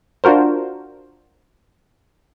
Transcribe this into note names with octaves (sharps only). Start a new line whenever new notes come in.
D4 F4 F#4 A#4 C5